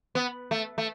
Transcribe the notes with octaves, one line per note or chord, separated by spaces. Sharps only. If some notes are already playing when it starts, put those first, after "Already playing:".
B3
A3
A3